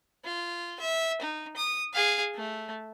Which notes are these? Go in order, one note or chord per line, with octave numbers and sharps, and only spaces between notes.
F4
E5
D#4
D#6
G#4 F5
A3